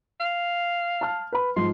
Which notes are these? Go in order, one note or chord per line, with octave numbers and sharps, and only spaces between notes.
F5
A5 F6
B4 B5
G#2 F3 C6